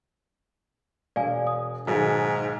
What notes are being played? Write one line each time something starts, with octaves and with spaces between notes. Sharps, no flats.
E1 D5 F5 G#5
D#6
B1 G#2 D#3 D#4